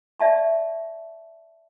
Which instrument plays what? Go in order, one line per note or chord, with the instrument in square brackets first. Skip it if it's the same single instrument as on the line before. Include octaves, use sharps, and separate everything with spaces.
[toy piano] D5 E5 A5 C#6